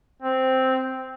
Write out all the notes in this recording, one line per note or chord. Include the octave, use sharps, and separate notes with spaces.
C4